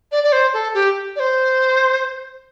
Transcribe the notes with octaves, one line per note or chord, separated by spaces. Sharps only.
D5
D5
C5
A4
G4
D5
C5